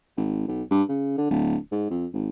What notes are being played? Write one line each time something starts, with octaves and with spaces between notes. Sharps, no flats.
G#1
B1
G2
C#3
D3
D1
G#2
F2
G#1